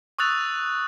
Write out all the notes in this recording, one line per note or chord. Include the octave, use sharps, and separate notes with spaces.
C#6 D#6 E6 F#6 A6 F7